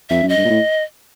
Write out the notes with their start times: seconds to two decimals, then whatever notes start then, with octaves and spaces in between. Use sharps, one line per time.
0.10 F2 E5
0.23 F#2
0.29 D#5
0.37 G2
0.45 A#2
0.50 A2